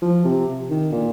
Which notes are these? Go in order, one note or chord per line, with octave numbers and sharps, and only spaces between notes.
F3
C3
D#3
A#2